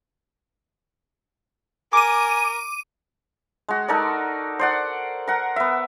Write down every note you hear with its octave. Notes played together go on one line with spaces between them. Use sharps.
A#4 G#5 D6 D#7
G#3 F#4
D#4 A4 A#4 D5
C5 D5 F#5
A#4 F#5
B3 E5